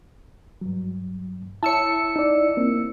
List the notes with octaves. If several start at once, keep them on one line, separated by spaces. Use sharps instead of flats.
G2 F#3
E4 C#5 A5 E6 C#7
D#4 D5
A#3 C4